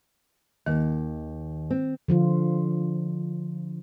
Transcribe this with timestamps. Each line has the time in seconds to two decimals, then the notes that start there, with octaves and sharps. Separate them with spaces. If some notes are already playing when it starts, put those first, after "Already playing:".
0.66 D#2 D#3
1.70 C4
2.08 D3 F3 F4